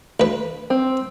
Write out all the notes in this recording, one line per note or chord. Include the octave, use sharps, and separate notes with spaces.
D2 B4
C4